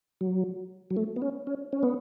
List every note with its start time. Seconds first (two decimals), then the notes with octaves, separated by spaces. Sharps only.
0.21 F#3
0.91 F#3
0.97 A3
1.16 B3
1.22 C#4
1.47 C#4
1.73 C#4
1.83 B3